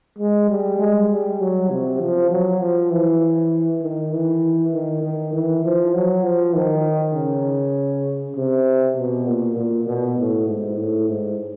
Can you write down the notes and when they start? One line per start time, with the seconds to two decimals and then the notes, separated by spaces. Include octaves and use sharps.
0.19 G#3
0.49 G3
0.79 G#3
1.10 G3
1.40 F#3
1.71 C3
2.00 F3
2.30 F#3
2.61 F3
2.91 E3
3.82 D#3
4.12 E3
4.74 D#3
5.03 D#3
5.33 E3
5.64 F3
5.94 F#3
6.25 F3
6.55 D#3
7.15 C#3
8.36 C3
8.97 B2
9.27 A#2
9.57 A#2
9.87 B2
10.18 A2
10.48 G#2
10.78 A2
11.09 G#2